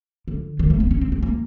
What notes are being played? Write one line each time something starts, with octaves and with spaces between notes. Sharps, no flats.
D3
D#3
A3
B3
C#4
C4
C4
A#3